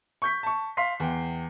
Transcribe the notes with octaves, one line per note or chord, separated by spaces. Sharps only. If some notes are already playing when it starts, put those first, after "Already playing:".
C#6 G6 B6
A5 C#6
F5 C6 B6 C7
E2 G5